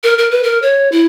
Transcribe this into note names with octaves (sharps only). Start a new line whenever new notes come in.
A#4
A#4
B4
A#4
C#5
E4